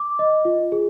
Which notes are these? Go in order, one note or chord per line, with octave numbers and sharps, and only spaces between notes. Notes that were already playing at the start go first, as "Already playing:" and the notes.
Already playing: D6
D#5
F4
G#4